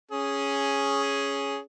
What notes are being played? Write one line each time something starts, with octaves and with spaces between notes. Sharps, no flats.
C#4 G#4